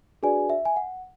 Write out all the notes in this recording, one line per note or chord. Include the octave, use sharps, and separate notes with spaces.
D4 F#4 G#4 B4 D5 G#5
E5
G#5
F#5